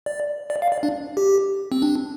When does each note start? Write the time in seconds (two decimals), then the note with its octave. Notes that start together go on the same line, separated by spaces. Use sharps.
0.06 D5
0.50 D5
0.62 F5
0.72 D5
0.83 D4
1.17 G4
1.72 C4
1.82 D4